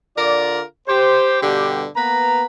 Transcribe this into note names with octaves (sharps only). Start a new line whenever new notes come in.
D3 F4 A#4 D5
G4 C5
G2 B2 D3 G3 G4
A#3 B3 B4 A#5